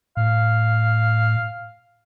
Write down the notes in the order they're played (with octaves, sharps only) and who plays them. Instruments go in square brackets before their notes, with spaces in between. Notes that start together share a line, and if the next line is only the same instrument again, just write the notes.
[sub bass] A2 [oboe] F5